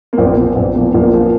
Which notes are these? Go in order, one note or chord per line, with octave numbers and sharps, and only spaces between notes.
A#3
A#1 C4
A#2 F3
A#1
A#2 F3
A#1 A#3
A#2 F3